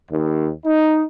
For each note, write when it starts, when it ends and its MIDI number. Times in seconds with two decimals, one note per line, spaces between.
0.11 0.50 39
0.66 1.04 63